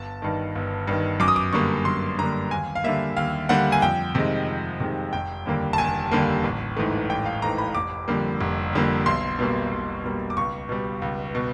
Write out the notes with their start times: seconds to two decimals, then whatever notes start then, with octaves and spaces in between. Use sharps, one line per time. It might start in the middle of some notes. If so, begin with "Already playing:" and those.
Already playing: G1 A5
0.22 G2 D#3
0.55 G1
0.87 G2 D#3
1.20 F#2 D6
1.28 D#6
1.36 D6
1.53 D3 G3 A#3 C#6
1.85 F#2 C6
2.18 D3 G3 A#3 A#5
2.51 D#2 G#5
2.75 F5
2.84 D3 G3 A#3 E5
3.16 D#2 F5
3.49 D3 G3 A#3 F#5
3.72 G#5
3.82 F2 G5
4.15 C3 D#3 G#3
4.48 F2
4.80 C3 D#3 G#3
5.13 F1 G5
5.46 D#2 D3 G3 A#3
5.73 A5
5.78 F1 G#5
6.11 D#2 D3 G3 A#3
6.43 A1
6.77 G#2 E3 A3
7.10 A1 G5
7.26 F5
7.42 G#2 E3 A3 A#5
7.58 B5
7.75 F1 D6
8.08 F2 D3 G3 A#3
8.41 F1
8.73 F2 D3 G3 A#3
9.06 B1 C6
9.39 B2 G3 A#3
9.71 B1
10.04 B2 G3 A#3
10.30 D6
10.37 C#2 C#6
10.69 B2 G3
11.02 C#2
11.35 B2